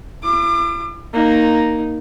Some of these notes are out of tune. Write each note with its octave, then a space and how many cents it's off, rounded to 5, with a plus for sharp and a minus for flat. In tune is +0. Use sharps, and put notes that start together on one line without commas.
E4 +45 D6 +35
A#3 +0 D#4 +0